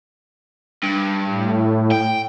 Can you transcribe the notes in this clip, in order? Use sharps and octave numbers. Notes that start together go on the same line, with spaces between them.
G2
A2
G5